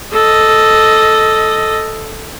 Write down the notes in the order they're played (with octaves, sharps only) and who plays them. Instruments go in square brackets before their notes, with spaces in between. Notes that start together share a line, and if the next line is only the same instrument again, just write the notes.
[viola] A4 D#5